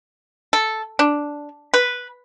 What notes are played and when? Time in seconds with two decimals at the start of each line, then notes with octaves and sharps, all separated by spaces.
0.53 A4
0.99 D4
1.74 B4